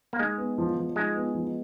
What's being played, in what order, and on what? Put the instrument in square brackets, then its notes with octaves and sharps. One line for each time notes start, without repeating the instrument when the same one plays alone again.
[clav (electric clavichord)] A#3
[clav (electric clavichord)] G#3 [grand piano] D#4
[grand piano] B3
F3
F3
[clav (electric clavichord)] G#3 [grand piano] D#4
[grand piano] B3
F3